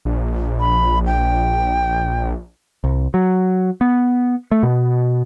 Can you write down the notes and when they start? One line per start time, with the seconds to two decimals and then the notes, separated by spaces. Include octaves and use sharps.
0.05 A#1
0.60 B5
1.06 G5
2.84 C2
3.14 F#3
3.81 B3
4.51 A3
4.63 B2